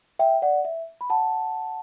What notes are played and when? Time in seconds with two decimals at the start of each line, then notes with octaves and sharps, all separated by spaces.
0.19 E5 G5
0.42 D5 F#5
0.65 E5
1.01 B5
1.10 F#5 A5